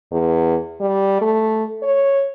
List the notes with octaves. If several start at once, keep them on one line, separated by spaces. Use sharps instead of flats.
E2
G3
A3
C#5